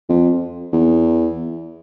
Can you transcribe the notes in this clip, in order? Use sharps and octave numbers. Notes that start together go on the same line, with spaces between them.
F2
E2